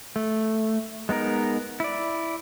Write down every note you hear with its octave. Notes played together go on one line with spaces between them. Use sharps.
A3
G#3 B3 D#4 A#4
E4 D5